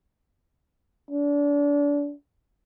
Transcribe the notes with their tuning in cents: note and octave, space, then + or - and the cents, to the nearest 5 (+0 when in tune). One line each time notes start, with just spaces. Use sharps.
D4 -30